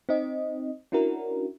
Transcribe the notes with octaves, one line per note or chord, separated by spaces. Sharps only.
C4 D#4 D#5
C#4 D4 E4 F#4 A#4